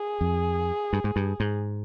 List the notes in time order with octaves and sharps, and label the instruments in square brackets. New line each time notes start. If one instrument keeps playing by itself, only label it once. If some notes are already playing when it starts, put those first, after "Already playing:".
Already playing: [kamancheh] G#4
[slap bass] F2
G2
G#2
G2
G#2